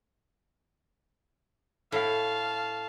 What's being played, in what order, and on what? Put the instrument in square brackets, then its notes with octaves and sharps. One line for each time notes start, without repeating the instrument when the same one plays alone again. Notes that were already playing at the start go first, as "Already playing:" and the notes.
[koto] A2 [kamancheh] F5 A5